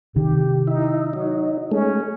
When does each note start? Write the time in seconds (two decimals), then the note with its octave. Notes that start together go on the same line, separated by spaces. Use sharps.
0.16 C3 D#3 G4
0.67 D#4 E4
1.13 F#3 D#4
1.72 G#3 A3 C#4